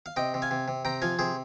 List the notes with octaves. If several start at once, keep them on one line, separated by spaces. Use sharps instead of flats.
F5
C3 D#5 G5
C3
F5 G#5
C3
C3
C3 G5 A#5
F3 F5 G#5
C3 G#4 C5